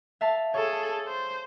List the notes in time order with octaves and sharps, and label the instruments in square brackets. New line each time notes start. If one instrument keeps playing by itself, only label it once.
[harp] E5 F5 A5
[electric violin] G#4 A4 [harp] C#5 A5
[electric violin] C5